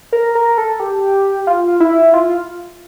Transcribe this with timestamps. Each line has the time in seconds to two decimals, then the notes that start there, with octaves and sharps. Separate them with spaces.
0.13 A#4
0.35 A#4
0.58 A4
0.80 G4
1.47 F4
1.80 E4
2.14 F4